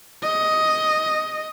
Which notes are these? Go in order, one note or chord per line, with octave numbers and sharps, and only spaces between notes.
D#5